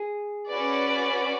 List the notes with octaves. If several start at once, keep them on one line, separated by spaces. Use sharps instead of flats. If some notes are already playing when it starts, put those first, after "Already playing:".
Already playing: G#4
C#4 F#4 B4 D5